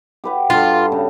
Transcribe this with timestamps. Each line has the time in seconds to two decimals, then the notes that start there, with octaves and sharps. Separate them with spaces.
0.24 G4 B4 F#5
0.50 G2 F4 A4
0.92 C#3